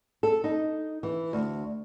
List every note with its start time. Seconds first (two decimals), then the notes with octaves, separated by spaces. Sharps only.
0.23 A4
0.44 D#4
1.03 E3
1.33 D2